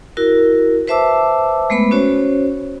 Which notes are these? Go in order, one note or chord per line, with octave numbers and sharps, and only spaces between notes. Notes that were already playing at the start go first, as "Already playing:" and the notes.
E4 F#4 A#4
B4 C5 E5 A5 D6 E6
G#3 A3 B3 B4 B5
C#4 F#4 C5 C#5